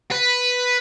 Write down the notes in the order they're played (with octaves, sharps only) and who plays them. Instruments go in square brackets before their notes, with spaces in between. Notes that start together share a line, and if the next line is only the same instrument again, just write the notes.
[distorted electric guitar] B4